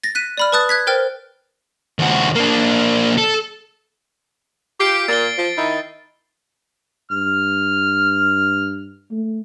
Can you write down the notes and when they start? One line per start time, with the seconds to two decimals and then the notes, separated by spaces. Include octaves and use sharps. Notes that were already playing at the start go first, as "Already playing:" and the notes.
0.03 A6 A#6
0.15 F#6 B6 D#7
0.37 D5 B5 F6
0.52 B4 A5 D#6 F#6 A6
0.69 F#6 G#6 B6
0.87 A#4 C5 G5 F6 A6
1.99 D#2 F#4
2.36 A#3 D4
3.18 A4
4.80 F4 G4 C7 D7
5.08 A#2 A6 G7
5.38 F3
5.57 D#3 D#4 E4
7.12 G2 F6
9.11 A3